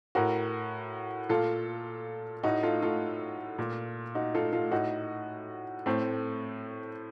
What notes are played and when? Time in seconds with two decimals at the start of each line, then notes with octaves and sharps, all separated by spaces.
0.15 A2 F#4 A#4
1.29 A#2 F4 A4
2.43 A2 D#4 F#4
2.63 F4 A4
2.82 F4 A4
3.59 A#2
4.15 D#4 F#4
4.35 F4 A4
4.53 F4 A4
4.71 A2 D#4 F#4
5.86 A2 A3 C4